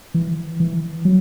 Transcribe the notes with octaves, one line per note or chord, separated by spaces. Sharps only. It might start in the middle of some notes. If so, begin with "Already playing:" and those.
E3
E3
F#3